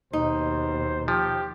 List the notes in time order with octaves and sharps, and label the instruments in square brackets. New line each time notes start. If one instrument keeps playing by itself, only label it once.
[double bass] D#2 B2 [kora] D#4 [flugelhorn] C5
[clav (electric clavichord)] F3 [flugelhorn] G4